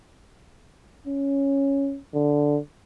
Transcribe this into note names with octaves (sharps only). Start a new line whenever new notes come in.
C#4
D3